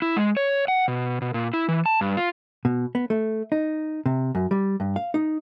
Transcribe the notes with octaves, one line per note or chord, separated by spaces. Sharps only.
E4
G#3
C#5
F#5
B2
B2
A#2
E4
E3
A5
G2
F4
B2
B3
A3
D#4
C3
F#2
G3
G2
F5
D#4